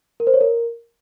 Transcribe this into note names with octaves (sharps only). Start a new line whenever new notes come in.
A#4
C5
C#5
A#4